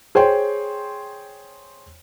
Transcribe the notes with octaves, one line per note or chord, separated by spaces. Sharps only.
G#4 C5 C#5 G5 C6